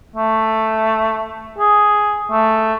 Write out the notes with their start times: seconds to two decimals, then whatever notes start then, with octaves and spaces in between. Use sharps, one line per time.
0.16 A3
1.59 G#4
2.31 A3